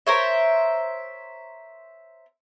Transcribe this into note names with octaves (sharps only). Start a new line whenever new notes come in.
A#4 C5 C#5 E5